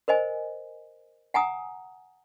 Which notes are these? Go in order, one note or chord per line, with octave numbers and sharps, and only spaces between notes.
A#4 C5 D#5 G#5
F#5 G#5 A#5 D#6